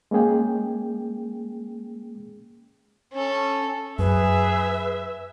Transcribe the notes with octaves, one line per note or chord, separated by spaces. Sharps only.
G#3 A#3 C#4 G#4 G5
C#4 A4
F#2 G#4 B4 E5